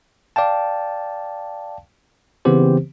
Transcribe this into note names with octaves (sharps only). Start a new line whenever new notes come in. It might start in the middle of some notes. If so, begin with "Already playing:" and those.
D5 F5 G5 A5
C#3 E3 B3 C4 G4 C5